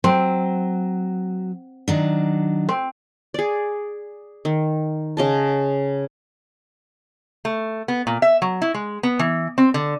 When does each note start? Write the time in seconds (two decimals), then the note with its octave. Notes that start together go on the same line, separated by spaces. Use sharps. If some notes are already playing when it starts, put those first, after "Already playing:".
0.04 F#3 C4
1.88 D#3 F#3 D4
2.69 C4
3.34 G#4 D5
4.45 D#3
5.17 C#3 D#5 A5
7.45 A3
7.88 B3
8.07 A#2
8.22 E5
8.42 F#3
8.62 E4
8.74 G#3
9.03 B3
9.19 E3
9.58 C4
9.74 D3